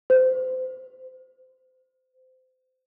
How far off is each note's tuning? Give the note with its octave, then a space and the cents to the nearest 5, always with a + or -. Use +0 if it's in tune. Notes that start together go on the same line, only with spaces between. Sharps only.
C5 -25